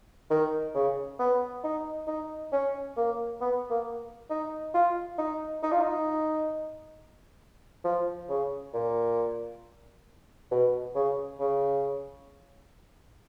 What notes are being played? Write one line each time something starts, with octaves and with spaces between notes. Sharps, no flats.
D#3
C#3
B3
D#4
D#4
C#4
A#3
B3
A#3
D#4
F4
D#4
D#4
F4
D#4
F3
C#3
A#2
B2
C#3
C#3